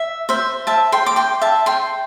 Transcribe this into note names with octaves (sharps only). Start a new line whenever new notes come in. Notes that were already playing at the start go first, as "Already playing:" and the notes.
Already playing: E5
C5 E5
E5 A5
G5 C6
D6
G5 C6
E5 A5
G5 C6